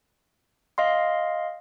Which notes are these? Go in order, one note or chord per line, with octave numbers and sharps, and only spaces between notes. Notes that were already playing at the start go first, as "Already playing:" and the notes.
D#5 F5 C6